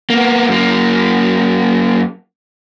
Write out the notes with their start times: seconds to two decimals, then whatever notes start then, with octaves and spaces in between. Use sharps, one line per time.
0.10 A#3 B3
0.48 F#2 A#3